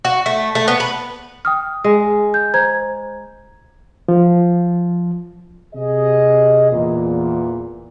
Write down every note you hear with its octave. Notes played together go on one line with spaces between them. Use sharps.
F#4
A3
A3
B3
B4
G5 D#6 F6
G#3
G6
C5 A#5 G#6
F3
C3 G#4 D#5
E2 A#2